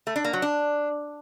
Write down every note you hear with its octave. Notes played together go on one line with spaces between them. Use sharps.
A3
D4
A#3
F#3
D4